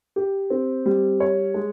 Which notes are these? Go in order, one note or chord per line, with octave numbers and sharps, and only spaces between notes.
G4
C4
G3
C#5
G#3